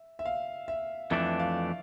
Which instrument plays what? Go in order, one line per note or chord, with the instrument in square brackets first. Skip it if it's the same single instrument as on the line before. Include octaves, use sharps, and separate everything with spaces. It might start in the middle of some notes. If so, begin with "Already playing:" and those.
Already playing: [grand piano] E5
E5
F5
E5
[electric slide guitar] F2 E3 A3 D4 [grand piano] E5
[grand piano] F5